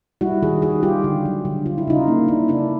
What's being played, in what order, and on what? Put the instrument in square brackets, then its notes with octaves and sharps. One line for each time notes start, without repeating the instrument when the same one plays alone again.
[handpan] G3 E4 F#4
D#3 F#4 G#4
D#3 F#4 G#4
G3 F4 G4
D3
F#3
D3
D3 F4
E4
C#3 D#4 F4
A#3
C#3 D4 E4
C#3 D4 E4